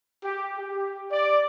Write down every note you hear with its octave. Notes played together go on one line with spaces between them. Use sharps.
G4
G4
D5